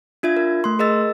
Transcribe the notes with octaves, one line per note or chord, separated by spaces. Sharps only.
D4 F4 E5 G#6
A#4
A3 C6
G#4 A#4 D#5 E6 A6